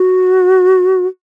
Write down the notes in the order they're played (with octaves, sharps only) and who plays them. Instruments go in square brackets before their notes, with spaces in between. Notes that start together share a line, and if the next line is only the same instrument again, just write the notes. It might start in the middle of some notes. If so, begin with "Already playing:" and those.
Already playing: [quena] F#4